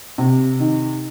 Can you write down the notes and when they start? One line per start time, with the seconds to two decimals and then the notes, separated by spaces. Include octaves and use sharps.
0.18 C3
0.60 D#3